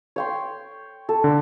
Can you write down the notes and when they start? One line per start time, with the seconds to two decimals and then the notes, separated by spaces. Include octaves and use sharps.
0.16 C#5 G5 C6
1.09 A4
1.24 D3